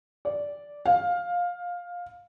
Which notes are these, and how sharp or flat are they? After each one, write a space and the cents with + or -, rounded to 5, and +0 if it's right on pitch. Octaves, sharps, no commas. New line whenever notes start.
D5 -5
F5 +15